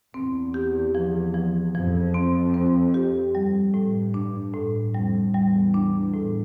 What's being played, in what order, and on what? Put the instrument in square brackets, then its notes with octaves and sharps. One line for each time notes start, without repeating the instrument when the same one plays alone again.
[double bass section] E2 [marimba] C4
[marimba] G4
F3
F3
[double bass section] F2 [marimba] F3
[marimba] C4
C4
G4
[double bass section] G2 [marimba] G3
[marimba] A2
D4
A2
[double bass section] F2 [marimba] G3
[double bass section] E2 [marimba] G3
[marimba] D4
A2